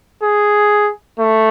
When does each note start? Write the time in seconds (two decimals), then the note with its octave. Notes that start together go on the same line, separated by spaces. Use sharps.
0.23 G#4
1.19 A3